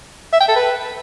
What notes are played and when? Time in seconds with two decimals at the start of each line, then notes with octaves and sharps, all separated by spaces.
0.33 E5
0.41 G5
0.48 A4
0.56 B4